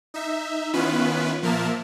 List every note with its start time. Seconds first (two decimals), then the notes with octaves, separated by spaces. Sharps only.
0.14 D#4 E5
0.73 D#3 B3 C#4 E4 F4 B4
1.42 A#2 F3 A#3 A#4 E5 A5